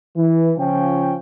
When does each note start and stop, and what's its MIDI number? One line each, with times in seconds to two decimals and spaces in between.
0.16 0.51 52
0.58 1.15 49
0.58 1.15 53
0.58 1.15 61
0.58 1.15 65
0.58 1.15 79